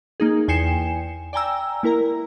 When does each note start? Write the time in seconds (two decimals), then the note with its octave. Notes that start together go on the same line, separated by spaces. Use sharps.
0.20 A#3 D#4 G#4
0.48 E2 G5 G#5 C7 C#7 E7
1.33 D5 G5 G#5 A#5 E6
1.83 A#3 E4 A#4 A#5